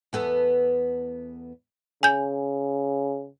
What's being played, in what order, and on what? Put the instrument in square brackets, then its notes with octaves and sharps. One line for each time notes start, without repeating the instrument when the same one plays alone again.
[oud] E2 B3 A4
[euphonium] C#3 [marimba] G#5 G6